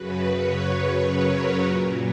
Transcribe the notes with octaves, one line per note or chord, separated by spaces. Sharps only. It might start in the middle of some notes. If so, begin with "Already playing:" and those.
Already playing: F#2 C#3 F#3 B4
C#5
B4
A#4
A#2 F#3